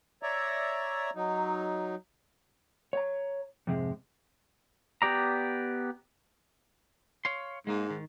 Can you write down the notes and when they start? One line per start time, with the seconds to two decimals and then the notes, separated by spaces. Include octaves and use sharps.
0.23 C#5 D5 E5 A#5
1.15 F#3 D#4
2.93 C#5 A#5
3.67 F2 G#2 C3 G#3
5.02 B3 G4 D5 A#5
7.25 C#5 F5 C6
7.67 G#2 G#3 A#3 D#4
7.90 D#3